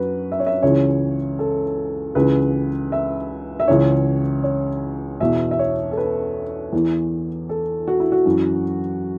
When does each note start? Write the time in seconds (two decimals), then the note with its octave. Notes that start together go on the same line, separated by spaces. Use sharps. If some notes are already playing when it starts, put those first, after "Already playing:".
Already playing: F#2 F#4 B4
0.32 E5
0.40 C#5
0.47 E5
0.62 C#2 C#3 E3 C#5
1.39 A4
2.15 C#2 C#3 E3 B4
2.92 E5
3.60 E5
3.68 C#2 C#3 E3 C#5
4.44 C#5
5.20 E2 B2 E5
5.51 E5
5.59 C#5
5.92 A4
5.97 B4
6.73 E2 E3
7.49 A4
7.88 F#4
8.00 E4
8.12 F#4
8.26 F#2 E3